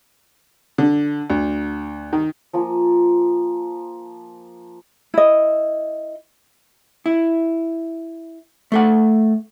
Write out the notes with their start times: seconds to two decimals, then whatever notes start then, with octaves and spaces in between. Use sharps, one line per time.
0.78 D3
1.30 D2
2.13 D#3
2.53 F3 A#3 F4 G#5
5.14 E4 D#5
7.06 E4
8.72 A3 A4 F#5